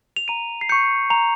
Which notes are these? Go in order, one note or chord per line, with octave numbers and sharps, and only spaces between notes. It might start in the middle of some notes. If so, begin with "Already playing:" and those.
F7
A#5 D#7
C7
C#6 G6 C#7
A#5 F7